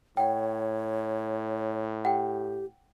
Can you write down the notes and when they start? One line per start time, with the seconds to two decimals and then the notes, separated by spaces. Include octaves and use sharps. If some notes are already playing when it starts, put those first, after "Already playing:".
0.17 A2 C#5 F#5 G5
2.05 G4 F#5 G5